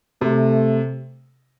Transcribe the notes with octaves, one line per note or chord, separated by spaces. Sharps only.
C3 A3